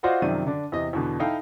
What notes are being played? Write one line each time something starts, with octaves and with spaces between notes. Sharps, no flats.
F4 F#4 C5 D5 D#5 F#5
F#2 C3 D#3 F3 D5 D#7
D3 D4
E2 C3 D#5
E2 B2 D3
D#4 E4 A4 F5 G5